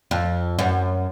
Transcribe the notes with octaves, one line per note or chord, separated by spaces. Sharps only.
F2
F#2